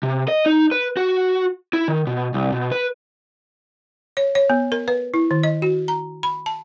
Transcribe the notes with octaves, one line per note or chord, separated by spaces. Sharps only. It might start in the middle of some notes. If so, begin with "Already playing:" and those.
C3
D#5
D#4
B4
F#4
E4
D#3
B2
C2
B2
B4
C#5
C#5
B3
A#4
B4
E4
D#3
D#5
F#4
A#5
B5
A5